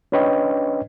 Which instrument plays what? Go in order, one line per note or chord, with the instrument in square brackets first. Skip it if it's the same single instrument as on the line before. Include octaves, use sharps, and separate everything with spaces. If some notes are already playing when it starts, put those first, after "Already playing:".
[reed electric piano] C#4 D4 B4 C#5 D#5 G5